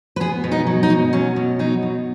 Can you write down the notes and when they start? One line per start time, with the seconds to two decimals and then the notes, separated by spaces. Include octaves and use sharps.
0.16 B4
0.20 B3 G#4
0.44 B2
0.52 D#4
0.67 F#3
0.83 D#4
0.90 B2
1.13 F#3 C#4
1.36 B2
1.59 F#3 D#4
1.83 B2